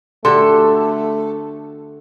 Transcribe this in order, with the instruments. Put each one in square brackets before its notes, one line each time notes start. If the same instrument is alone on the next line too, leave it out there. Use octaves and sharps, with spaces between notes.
[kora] D3 F#4 G4 [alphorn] A3 [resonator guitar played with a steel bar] A4 [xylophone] C6